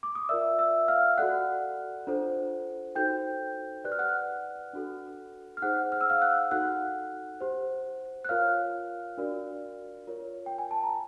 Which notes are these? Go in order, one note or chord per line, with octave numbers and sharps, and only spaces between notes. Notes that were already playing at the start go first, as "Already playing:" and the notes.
D6
D#6
F4 A#4 D5 E5 E6
E5 E6
F5 F6
F#4 A4 D5 F#5 F#6
D4 F4 A4 C5
D#4 F#4 A4 C5 G5 G6
G4 B4 D5 F#6
F6
F#5 F#6
D4 F#4 A4
F6
D#4 G#4 C5 F#5 F#6
F6
E6
F5 F6
F#5 F#6
D#4 F#4 A4 F#5 F#6
G4 C5
F#6
F4 A#4 C#5 F5 F6
D4 F#4 A#4 D5
F4 A#4 C#5
G5
G#5
A5
A#5